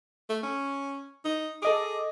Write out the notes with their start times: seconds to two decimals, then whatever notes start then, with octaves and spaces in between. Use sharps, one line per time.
0.30 A3
0.43 C#4
1.25 D#4
1.62 G#4 A4 D#5 D6